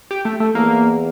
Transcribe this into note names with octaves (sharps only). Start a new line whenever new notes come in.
G4
A3
A3
E2 A#3